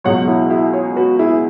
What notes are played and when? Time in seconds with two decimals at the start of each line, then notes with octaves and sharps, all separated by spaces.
0.04 C#2 B2 F#3 C#5 F#5
0.28 E4 G#4
0.50 E4 G#4
0.73 G#4 C#5
0.96 F#4 B4
1.19 E4 G#4